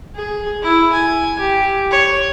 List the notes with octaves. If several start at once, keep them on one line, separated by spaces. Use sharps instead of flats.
G#4
E4
G#5
G4
C#5